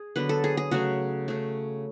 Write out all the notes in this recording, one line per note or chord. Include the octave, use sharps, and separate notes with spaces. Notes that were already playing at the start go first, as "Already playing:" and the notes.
Already playing: G#4
D3 F#3 B3 B4
A4
G#4
G#4
C#3 F#3 A3 F#4
C#3 F#3 A3